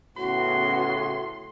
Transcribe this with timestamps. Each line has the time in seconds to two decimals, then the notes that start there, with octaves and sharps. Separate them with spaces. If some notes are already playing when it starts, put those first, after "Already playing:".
0.17 A2 C#3 B3 C#4 F#4 C6